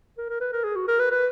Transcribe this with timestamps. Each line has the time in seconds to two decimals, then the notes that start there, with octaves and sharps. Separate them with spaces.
0.18 A#4
0.30 A#4
0.41 B4
0.53 A#4
0.64 G#4
0.76 F#4
0.88 A#4
1.00 B4
1.11 B4